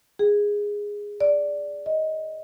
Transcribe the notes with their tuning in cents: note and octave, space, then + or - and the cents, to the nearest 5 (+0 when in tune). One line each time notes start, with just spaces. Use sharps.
G#4 -10
D5 -5
D#5 +15